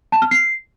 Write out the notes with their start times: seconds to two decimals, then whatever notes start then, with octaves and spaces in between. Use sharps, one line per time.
0.12 A5
0.22 F6
0.31 C7